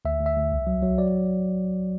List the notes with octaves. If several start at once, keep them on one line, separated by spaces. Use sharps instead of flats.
D2 E5
D2
E5
D2
C2
F#3
F#3
F#3 D5